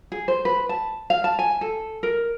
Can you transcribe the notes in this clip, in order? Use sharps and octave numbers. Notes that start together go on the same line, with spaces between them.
G#4
C5
B4
A5
F5
A5
G#5
A4
A#4